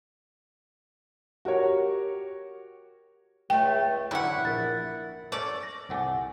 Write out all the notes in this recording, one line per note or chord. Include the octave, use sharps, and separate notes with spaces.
F#4 G4 A#4 C#5
C#2 A3 G5
D3 F#3 C#4 E4 F#5
A#1 A#4 A6
A3 C#4 A4 D5
A#6
C2 A3 F#5 G#5 D6